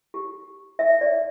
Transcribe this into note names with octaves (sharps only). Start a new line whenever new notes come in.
G4
E5
D5